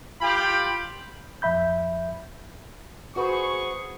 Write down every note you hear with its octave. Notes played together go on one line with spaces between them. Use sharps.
F4 G4 G5 B5
F2 F3 E5 B5 G6
F#4 G#4 B4 C5 C#6